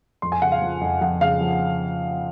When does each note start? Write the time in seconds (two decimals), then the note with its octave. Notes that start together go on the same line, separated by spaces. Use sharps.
0.22 F2 C6
0.32 G#5
0.42 C#3 F#5
0.52 F5
0.62 F3
0.81 F2
1.01 F2 F#5
1.21 C#3 F5
1.41 F3